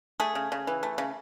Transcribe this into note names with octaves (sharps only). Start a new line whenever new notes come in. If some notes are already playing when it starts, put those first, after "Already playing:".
A3 G#4
C#3
C#3
E3
A3
C#3